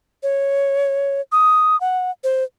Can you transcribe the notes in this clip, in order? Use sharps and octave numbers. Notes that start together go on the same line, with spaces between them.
C#5
D#6
F#5
C5